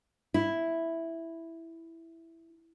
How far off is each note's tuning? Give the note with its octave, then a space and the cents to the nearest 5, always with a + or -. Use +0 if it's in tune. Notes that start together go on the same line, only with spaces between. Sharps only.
E4 +0